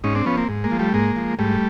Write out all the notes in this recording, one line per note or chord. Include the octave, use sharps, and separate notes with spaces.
G#2 C#4 D#4
C4 D4
F3 B3 C#4
A#3 C4
G#2
G#3 A#3
F3
G3 A3
G#2 G#3 A#3
F3
G#2 G3 A3